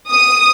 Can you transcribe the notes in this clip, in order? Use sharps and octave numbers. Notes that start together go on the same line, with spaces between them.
D#6